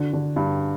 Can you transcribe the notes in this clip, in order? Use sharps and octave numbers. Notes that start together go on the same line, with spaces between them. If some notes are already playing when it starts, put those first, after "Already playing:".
Already playing: D3 F#4
D3
G2